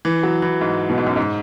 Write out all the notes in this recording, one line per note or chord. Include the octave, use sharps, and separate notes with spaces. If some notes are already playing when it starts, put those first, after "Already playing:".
E3
F#3
E3
G#2
B2
G#2
F#2
G#2